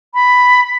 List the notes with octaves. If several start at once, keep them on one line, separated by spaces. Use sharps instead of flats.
B5